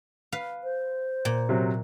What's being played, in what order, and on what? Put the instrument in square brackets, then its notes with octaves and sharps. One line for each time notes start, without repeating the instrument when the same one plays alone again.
[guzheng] B4 F5
[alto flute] C5
[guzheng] A#2
[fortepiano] C3 F#3